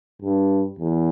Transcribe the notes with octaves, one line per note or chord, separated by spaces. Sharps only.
G2
E2